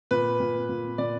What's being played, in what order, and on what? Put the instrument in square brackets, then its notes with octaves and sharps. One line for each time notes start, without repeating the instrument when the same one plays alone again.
[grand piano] A#2 B4
A#2
A#2
A#2 D5